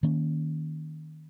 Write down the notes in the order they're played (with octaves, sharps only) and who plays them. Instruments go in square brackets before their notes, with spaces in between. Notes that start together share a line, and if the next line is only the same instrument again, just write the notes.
[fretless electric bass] D#3 A#3 C#4